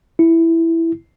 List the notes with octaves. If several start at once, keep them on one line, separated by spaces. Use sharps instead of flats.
E4